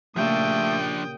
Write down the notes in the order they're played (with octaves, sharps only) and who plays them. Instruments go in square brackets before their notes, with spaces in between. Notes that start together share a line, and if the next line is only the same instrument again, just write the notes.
[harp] A#2 C#3 G4 [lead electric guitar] F3 D4 [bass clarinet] A3 [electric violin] G5 D#6